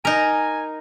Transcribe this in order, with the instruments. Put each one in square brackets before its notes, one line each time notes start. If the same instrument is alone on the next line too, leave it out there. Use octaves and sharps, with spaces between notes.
[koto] D#4 A#4 [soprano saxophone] G#5